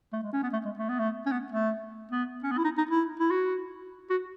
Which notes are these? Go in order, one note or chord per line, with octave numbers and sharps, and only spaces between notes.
A3
G#3
C#4
B3
A3
G#3
A3
B3
A3
C#4
B3
A3
B3
C#4
B3
E4
D#4
D#4
E4
E4
F#4
F#4